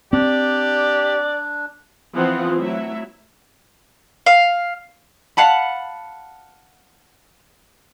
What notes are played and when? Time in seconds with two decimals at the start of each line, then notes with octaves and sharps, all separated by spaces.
0.13 C4 D4 G4 D5
2.14 E3 F3 B3 C4 F4 F#5
2.60 F#3 A3 E4 E5
4.26 F5
5.37 F5 F#5 A5 B5